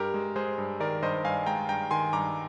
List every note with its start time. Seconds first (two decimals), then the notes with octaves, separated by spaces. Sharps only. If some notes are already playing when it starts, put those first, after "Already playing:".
Already playing: G2 G4 A#4
0.14 G#3
0.36 G#3 G#4 C5
0.58 G2
0.80 D#3 A#4 D5
1.02 G2 C5 D#5
1.25 G2 F5 G#5
1.46 G#3 G5 A#5
1.69 G2 G5 A#5
1.91 D#3 G#5 C6
2.13 G2 A#5 D6